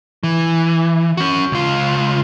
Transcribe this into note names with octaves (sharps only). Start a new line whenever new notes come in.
E3
C#4 F#4
C#2 F4